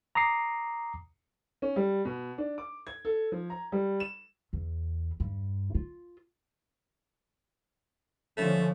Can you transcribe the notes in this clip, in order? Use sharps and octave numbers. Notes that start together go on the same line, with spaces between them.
A#5 D6 D#6 C7
C#4
G3
B2
D4
D6
G#6
A4
F3
A#5
G3
E7
E2
G2
F4
D3 F3 A3 C#4